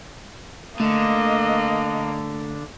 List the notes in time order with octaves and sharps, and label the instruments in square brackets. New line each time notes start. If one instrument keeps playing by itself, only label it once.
[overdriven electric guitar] D3 [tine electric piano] A3 [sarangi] A#3 [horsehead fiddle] D#5